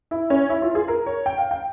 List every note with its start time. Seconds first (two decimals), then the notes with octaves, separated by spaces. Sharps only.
0.11 E4
0.30 C#4
0.50 E4
0.62 F4
0.75 G#4
0.88 A#4
1.06 C#5
1.26 G5
1.38 F5
1.51 G5